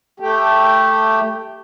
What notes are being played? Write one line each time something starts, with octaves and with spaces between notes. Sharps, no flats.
A3 G4